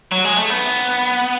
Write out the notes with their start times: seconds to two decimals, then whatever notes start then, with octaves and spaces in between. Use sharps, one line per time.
0.12 F#3
0.25 G#3
0.37 A3
0.50 B3